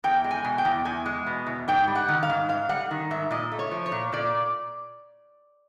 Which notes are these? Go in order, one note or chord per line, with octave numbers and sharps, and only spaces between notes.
E2 G5
G#3
G#5
B2
G5
E2
E2 G#5
G#3
B2
E2
G#2 G5
G3
F#5
D#3
F5
G#2
G#2 F5
G3 F#5
D#3
G#2 E5
A#2 D#5
A3
C#5
F3
C#5
A#2
A#2 D5